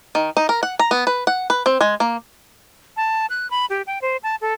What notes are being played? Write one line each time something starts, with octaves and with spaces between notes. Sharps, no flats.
D#3
D#4
A#4
F#5
A#5
B3
B4
F#5
B4
C4
G#3
A#3
A5
F#6
B5
G4
G5
C5
A5
A4